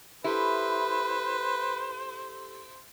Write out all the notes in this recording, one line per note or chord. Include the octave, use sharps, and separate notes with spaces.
E4 G4 A4 B4 C5